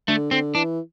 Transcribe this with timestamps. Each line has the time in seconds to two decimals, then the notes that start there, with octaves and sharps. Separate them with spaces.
0.08 D3 A3
0.31 D3 C4
0.55 E3 D4